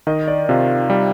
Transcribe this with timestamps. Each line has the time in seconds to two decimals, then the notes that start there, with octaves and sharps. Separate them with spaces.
0.07 D#3 D#5
0.28 D5
0.49 C3 F4
0.90 G3